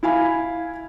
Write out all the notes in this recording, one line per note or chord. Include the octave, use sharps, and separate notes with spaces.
E4 F5 G#5 B5